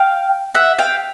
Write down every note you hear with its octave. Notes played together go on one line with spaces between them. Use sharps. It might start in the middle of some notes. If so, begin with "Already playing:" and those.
Already playing: F5 G5
E5 F#5
F5 G5